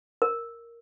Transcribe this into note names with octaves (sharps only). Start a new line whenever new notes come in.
A#4